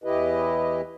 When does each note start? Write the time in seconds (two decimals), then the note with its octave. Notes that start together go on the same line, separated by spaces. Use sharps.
0.04 E2 E3 E4 G4 B4 D#5